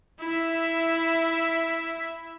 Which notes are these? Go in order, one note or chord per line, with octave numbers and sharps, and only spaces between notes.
E4 E5